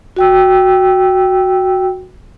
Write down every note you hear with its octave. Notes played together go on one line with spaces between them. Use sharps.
F#4 G5 E6